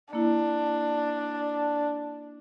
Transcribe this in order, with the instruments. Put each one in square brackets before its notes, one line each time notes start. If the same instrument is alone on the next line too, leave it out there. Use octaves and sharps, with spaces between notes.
[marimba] A#3 E4 [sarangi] D4